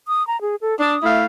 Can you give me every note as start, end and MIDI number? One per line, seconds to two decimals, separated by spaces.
0.08 0.26 87
0.27 0.40 82
0.41 0.56 68
0.61 0.78 69
0.80 0.94 62
0.80 1.09 87
1.03 1.26 57
1.03 1.26 64
1.03 1.26 77